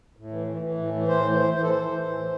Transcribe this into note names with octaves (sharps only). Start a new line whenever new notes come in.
A2
E3
E3
E3
A2
E3
A2 C5
E3
C5
E3
E3 C5
A4
E3 C5
E3
A2
E3